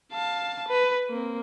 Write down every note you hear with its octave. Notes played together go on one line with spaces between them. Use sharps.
F5 A5
B4
A#3 C4